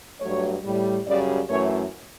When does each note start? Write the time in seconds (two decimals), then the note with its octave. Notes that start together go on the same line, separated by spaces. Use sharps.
0.21 G2 F#3 A3 C#5
0.64 A2 G3
1.06 F#2 C#3 G3 D5
1.49 F#2 E3 A3 C#5